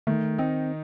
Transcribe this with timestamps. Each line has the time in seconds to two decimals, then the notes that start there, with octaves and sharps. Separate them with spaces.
0.07 D#3 A3
0.38 C4 D#4